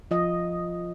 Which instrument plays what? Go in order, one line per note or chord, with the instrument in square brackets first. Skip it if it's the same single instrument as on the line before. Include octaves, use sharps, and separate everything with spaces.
[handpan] F3 F4 D#5